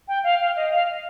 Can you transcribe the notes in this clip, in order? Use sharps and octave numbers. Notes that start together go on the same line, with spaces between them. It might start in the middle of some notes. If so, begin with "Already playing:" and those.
G5
F5
F5
D#5
F5